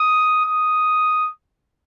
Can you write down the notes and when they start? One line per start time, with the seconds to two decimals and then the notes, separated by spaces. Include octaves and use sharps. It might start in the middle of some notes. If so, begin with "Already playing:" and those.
Already playing: D#6
0.45 D#6